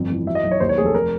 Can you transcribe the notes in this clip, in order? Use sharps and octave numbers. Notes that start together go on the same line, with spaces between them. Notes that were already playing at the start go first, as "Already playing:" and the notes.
Already playing: G1 F2
E3
F#3 E5
D#5
B1
C#5
D#2 C5
C#5
F1 G#4
A4
A#4